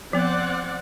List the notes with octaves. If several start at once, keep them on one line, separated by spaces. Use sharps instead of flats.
F3 B3 C4 D5 F#5